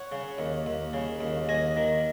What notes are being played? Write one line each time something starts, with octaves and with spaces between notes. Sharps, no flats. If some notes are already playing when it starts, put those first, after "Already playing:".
Already playing: C#5 F#5
C#3
D#2
D#2
C#3
D#2
D#2 D#5 G#5
D#3